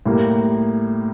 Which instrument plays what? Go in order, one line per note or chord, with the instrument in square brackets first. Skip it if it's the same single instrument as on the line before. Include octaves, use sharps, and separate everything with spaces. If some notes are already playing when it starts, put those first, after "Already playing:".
[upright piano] A2 G3 A#3